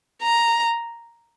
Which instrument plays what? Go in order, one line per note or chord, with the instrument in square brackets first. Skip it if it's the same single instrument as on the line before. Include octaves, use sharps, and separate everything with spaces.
[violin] A#5